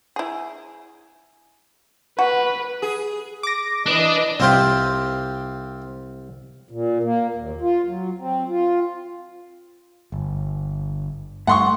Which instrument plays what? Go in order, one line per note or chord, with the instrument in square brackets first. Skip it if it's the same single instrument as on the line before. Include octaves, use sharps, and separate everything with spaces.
[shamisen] E4 G#4
[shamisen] F#4 [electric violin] B4
[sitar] G#4
[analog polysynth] D6 A#6
[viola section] E3 B4 D#5 [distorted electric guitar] D4 D5
[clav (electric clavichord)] C2 C3 [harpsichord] C4 F4 G4
[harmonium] A#2
A#3
D#2
F4
F#3
C4
F4
[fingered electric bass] G1
[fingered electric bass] G2 A3 [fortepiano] F#5 C6 C#6